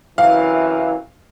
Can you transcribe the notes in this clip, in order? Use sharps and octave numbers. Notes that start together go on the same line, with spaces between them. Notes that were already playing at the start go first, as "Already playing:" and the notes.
F#2 C3 E3 F5